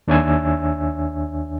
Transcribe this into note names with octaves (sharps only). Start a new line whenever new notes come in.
D#2 D4 C#5 E5 G#5 E6